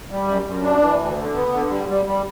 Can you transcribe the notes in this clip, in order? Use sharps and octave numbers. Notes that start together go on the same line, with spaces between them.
G3
F#2
F#2
D4
E3
D2
D3
B3
D3
G3
G3
G3